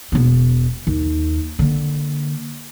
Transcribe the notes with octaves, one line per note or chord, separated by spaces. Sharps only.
E1 B3
D#2
D3 A#3